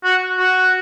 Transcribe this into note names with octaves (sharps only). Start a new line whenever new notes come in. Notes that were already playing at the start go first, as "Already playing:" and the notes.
F#4
F#4